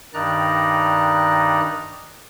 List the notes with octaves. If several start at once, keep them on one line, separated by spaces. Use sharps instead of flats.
G2 D#3 D#4 D5 A#5 F#6